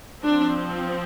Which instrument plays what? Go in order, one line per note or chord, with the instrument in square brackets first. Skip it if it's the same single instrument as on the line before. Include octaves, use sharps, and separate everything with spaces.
[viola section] F3 C4 D4